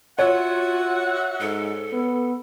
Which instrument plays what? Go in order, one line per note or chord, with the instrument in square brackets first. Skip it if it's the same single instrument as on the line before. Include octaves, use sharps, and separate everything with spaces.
[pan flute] F4 [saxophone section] F#4 E5 F#5 [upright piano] C#5
[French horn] G#2 [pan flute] A4
[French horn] B3